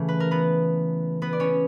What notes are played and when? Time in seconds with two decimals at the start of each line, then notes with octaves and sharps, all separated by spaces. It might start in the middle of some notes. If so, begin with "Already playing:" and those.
Already playing: C#3 E3 A3
0.09 B4
0.20 A#4
0.31 B3 B4
1.22 B3 B4
1.33 D5
1.40 C#4 C#5